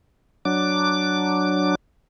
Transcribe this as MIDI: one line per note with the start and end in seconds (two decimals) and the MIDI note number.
0.45 1.75 54
0.45 1.75 62
0.45 1.75 86